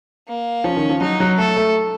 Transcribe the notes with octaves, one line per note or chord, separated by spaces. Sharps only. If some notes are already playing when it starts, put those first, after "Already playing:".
A#3
F3 C#4
D#3
F3
F#3 D#4
F#3
A3 A4
A3